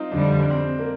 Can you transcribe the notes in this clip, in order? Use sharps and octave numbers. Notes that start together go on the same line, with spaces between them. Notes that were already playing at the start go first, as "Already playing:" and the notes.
Already playing: C4 D#4 F4
F2 D3 G3 D4
D4
C4
A#3